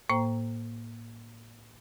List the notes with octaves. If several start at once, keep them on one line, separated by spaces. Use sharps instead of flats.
A2 A#3 C5 G5 A#5